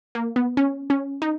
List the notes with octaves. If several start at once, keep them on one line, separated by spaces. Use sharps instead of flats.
A#3
B3
C#4
C#4
D#4